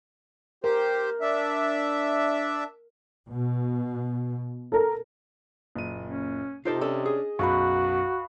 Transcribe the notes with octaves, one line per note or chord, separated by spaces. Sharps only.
G4 A#4 C5
D4 E5
B2
A4 A#4
F#1 A#2 D#7
C#4
C3 D#4 F4 G4 A4 C5
C#4 D4 A4 D#5
G#4
B1 F#2 F#4 B4 F5 C#6